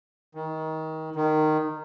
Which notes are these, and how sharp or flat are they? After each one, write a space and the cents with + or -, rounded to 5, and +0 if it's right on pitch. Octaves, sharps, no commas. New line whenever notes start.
D#3 +25
D#3 -10